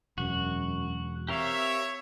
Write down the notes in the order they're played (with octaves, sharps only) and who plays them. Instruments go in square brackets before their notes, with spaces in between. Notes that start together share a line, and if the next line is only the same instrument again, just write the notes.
[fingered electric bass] E1 [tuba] F#2 [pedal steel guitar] F#4
[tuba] C4 [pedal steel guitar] G4 A#4 F5 [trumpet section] C#5 E5